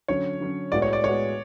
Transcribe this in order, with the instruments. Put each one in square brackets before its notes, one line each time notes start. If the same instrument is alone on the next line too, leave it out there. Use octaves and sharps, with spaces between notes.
[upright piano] D3 F#3 C#4 [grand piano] C#5
[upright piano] D3 F#3 C#4
[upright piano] A2 G#3 B3 F#4 [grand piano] D5
[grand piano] C#5
D5
[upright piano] A2 G#3 B3 F#4 [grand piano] C#5